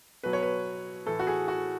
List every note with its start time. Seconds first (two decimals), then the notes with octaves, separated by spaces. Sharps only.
0.23 B2 F#3 B4
0.33 C#5
0.43 B4
1.06 A2 E3 A4
1.19 F#4
1.27 G#4
1.48 F#4